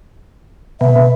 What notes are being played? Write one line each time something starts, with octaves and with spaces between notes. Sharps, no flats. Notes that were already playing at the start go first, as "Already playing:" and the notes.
B2 E5
B2